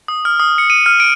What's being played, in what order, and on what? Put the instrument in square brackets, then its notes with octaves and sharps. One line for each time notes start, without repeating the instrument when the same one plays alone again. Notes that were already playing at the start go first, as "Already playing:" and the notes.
[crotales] D#6
F6
D#6
C#7
D#7
F6
D7